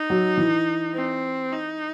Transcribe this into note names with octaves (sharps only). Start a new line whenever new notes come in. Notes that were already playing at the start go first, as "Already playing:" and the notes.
Already playing: D#4
F#3
E3
C4
D#4